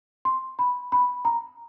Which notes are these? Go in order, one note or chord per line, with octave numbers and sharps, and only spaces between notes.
C6
B5
B5
A#5